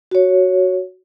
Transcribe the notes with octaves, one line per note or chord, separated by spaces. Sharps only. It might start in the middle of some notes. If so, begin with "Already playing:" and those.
F#4 C#5